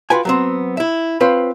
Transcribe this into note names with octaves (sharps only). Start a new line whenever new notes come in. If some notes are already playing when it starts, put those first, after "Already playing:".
F4 F#4 B4 G5 G#5
F#3 B3 C4
E4 E5
C4 F4 B4 C#5